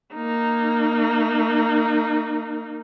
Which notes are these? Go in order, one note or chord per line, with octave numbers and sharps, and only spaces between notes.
A#3 D#4